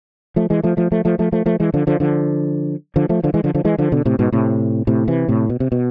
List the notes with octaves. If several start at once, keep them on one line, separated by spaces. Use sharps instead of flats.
F3 A3
E3 G#3
F3 A3
F3 A3
F3 A3
F3 A3
F3 A3
F3 A3
F3 A3
E3 G#3
D3 F3
D3 F3
D3 F3
D3 F3
F3 A3
D3 F3
E3 G#3
D3 F3
D3 F3
E3 G#3
D3 F3
B2 D3
A2 C3
G#2 B2
A2 C3
A2 C3
C3 E3
A2 C3
B2
C3
B2